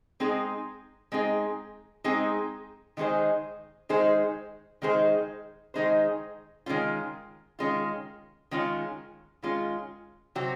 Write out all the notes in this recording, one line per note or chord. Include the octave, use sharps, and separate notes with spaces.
G#3 C4 D#4 G#4
G#3 C4 D#4 G#4
G#3 C4 D#4 G#4
D#3 G#3 D#4 G#4 C5
D#3 G#3 D#4 G#4 C5
D#3 G#3 D#4 G#4 C5
D#3 G#3 D#4 G#4 C5
D#3 G#3 C#4 F4
D#3 G#3 C#4 F4
D#3 G#3 C#4 F4
D#3 G#3 C#4 F4
C3 F#3 C4 F#4